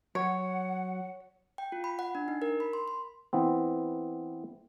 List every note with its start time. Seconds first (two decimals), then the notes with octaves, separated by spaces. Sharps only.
0.15 F#3 C#5 F#5
1.58 G5
1.72 F4
1.84 B5
1.99 F#5
2.15 D4
2.28 D#4
2.42 A#4
2.60 B5
2.73 C6
2.88 C6
3.33 E3 B3 C4